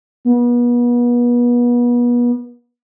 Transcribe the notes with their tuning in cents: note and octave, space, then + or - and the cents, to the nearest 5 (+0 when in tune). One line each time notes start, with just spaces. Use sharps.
B3 -35